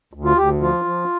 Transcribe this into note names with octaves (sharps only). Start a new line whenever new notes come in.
D2
F4
D2 G4
F3 F4
F3